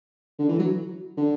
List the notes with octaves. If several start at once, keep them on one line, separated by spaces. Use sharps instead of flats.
D3
E3
F#3
D3